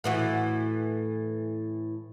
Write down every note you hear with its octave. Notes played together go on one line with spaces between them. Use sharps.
A2 E3 F#4